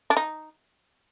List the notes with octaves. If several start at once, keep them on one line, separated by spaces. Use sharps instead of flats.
D4
D#4